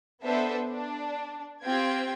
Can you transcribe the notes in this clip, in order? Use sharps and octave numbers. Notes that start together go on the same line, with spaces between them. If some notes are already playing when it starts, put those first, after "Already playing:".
B3 D4 A4 B4 C5 E5
D4
C4 F4 G4 G5 G#6